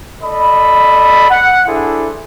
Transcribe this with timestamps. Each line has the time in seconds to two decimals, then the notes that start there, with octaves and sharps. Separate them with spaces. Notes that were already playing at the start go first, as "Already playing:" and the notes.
0.23 A4 D5 D#5 B5
1.30 F#5
1.68 D4 E4 G#4 A4 C5 E5